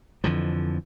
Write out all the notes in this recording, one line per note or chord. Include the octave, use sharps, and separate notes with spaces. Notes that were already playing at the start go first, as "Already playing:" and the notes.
F2 D3 E3 F3